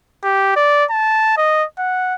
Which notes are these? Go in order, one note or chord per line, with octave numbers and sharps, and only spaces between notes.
G4
D5
A5
D#5
F#5